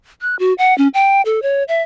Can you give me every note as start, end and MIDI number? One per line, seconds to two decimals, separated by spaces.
0.21 0.36 90
0.39 0.53 66
0.58 0.76 78
0.78 0.88 61
0.94 1.22 79
1.25 1.42 69
1.42 1.63 73
1.68 1.82 76